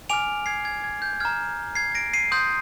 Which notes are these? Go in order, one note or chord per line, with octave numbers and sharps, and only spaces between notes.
G#5 D6 F6 D7 F7
G#6 C7
G#6
G#6
G6
A#5 F6 G#6
G#6 C7
A#6 D7
C7 D#7
C6 D#6 G6